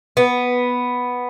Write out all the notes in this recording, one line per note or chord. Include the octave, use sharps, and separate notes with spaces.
B3